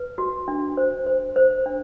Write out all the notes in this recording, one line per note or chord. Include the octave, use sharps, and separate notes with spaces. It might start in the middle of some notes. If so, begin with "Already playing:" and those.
Already playing: B4
F#4
D4
C5
C5
C5
D4